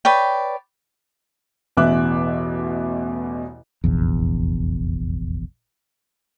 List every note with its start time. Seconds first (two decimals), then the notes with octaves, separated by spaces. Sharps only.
0.05 B4 C#5 D5 G5
1.77 A1 E2 B2 E5 D6 F#6
3.84 F1 A#1 E2